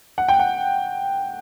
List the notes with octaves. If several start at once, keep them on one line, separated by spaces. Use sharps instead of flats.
F#5
G5
F#5